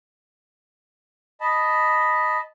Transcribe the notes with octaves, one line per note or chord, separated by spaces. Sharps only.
D#5 A5 B5